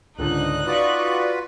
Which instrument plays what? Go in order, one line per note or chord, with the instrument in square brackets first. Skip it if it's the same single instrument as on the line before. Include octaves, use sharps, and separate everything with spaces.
[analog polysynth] C#2 G#2 D3 [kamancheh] D#4 F#6
[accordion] F4 F#4 B4 [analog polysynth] D5 C#6